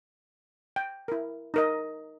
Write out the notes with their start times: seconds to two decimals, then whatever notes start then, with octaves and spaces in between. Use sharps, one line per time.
0.76 G5
1.08 E4 A#4
1.54 D#4 A#4 D#5